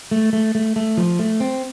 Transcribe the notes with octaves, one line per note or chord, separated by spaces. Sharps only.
A3
A3
A3
A3
F3
A3
C4